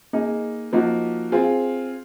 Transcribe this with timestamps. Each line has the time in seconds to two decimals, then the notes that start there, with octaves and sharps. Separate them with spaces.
0.13 A#3 D#4 G#4
0.73 F3 A#3 D#4 F#4
1.32 C4 F4 G#4